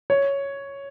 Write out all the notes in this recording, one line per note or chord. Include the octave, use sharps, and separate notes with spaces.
C#5